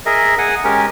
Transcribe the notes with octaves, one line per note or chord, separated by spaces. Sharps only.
G#4 A#4 D#5 E5
G#4 F#5 G#5
G#3 C#4 G4 A#4